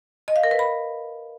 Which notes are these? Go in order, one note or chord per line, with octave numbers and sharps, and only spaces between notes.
D#5
F5
A#4
B4
B5